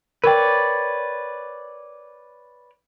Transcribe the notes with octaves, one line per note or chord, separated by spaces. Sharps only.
A#4 B4 C#5 D5 G5